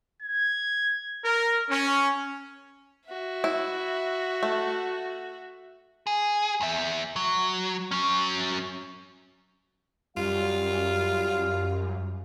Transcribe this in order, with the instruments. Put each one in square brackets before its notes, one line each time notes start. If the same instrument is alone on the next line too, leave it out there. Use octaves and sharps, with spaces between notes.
[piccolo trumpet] G#6
[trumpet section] A#4
C#4
[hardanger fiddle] F#4 E5
[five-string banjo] E4
A3
[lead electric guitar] G#4
E2 E5
F#3
F#3 C#4
[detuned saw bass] F#2 [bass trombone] G3 [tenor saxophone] F4 [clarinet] F5